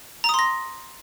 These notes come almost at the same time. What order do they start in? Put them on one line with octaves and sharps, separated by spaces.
A#5 D#6 C6 A#6